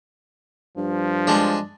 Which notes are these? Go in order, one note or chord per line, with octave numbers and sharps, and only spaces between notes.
G2 F3
G#3 D4